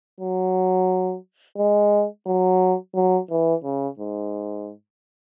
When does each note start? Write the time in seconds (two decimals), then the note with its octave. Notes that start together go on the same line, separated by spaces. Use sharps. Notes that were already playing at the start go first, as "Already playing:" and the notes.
0.20 F#3
1.57 G#3
2.27 F#3
2.95 F#3
3.30 E3
3.64 C#3
3.99 G#2